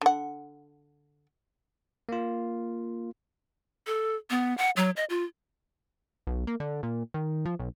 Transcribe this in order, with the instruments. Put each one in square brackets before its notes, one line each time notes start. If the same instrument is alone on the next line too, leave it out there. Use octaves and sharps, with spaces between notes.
[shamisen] D3 F#5
[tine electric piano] A#3 F4
[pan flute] A4
B3
F#5
F#3
D#5
F4
[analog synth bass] B1
A#3
D3
A#2
D#3
F3
B1